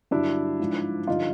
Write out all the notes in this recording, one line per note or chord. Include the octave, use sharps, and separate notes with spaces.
G2 D3 F#3 D4 E4
G#2 F3
G2 D3 F3 D#4 F4